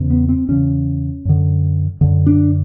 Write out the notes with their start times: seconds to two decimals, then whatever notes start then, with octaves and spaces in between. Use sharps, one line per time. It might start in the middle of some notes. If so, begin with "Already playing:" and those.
Already playing: E2 C#3
0.10 B3
0.29 C4
0.48 E2 C#3 C#4
1.25 F#2 D3
2.01 F#2 D3
2.26 D4